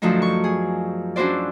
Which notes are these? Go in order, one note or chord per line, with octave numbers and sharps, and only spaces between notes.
F#2 D3 F3 A3 D#4
C#6
G#4
C#4 D4 E4 F#4 C5 D5